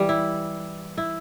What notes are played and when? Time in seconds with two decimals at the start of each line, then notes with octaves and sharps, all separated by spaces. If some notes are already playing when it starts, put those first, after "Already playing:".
Already playing: E3 G3
0.09 E4
0.98 E4